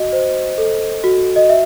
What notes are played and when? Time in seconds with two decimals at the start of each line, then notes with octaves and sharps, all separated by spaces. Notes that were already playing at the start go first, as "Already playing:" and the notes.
Already playing: F#4 D#5
0.12 C5
0.58 A4
1.04 F#4
1.36 D#5
1.49 E5